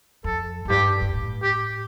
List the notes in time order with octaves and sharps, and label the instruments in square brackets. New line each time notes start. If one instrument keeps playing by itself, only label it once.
[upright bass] F2 [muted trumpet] A4
[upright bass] F2
[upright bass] G2 [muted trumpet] G4
[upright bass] G2
A2
[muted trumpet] G4